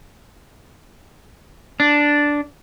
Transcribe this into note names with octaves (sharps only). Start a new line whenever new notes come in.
D4